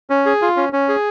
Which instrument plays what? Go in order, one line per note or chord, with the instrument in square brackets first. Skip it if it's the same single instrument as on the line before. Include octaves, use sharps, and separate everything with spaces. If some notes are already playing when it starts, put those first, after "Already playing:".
[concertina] C#4
G#4
F4
C#4
C#4
G#4